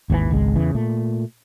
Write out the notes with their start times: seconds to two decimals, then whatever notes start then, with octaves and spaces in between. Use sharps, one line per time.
0.10 G#1 D#2 C3 E3
0.31 G#1 C#2 G#3
0.56 E2 C#3 E3
0.74 A#2 A3